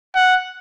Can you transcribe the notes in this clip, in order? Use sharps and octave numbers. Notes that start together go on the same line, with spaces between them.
F#5